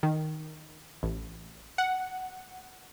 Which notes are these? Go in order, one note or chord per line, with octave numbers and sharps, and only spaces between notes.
D#3
A1
F#5